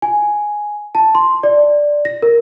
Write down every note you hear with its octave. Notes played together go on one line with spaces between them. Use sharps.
G#5
A5
C6
D5
A#6
A#4